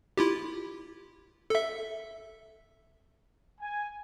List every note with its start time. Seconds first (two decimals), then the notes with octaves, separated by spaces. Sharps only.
0.17 E4 F4 G4
1.50 A4 E5
3.60 G#5